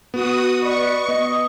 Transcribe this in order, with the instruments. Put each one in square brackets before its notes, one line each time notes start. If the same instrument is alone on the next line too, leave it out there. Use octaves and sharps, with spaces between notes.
[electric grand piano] B3 [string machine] F#4 D#6
[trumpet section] B4 D5 D#5 [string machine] C#6
[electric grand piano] B3 [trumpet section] D#5